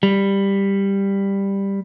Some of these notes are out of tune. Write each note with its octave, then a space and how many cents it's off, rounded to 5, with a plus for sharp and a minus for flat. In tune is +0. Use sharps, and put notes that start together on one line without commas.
G3 +10